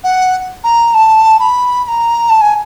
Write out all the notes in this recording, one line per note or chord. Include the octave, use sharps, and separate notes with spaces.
F#5
A#5
A5
B5
B5
A#5
A5
G#5